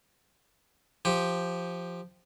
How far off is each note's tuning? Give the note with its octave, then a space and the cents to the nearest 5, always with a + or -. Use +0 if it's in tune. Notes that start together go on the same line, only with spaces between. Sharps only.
F3 +0 G4 +0